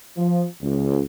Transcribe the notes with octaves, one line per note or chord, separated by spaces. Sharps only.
F3
C#2